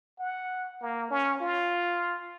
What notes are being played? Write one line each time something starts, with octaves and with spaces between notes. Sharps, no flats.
F#5
A#3
C#4
F4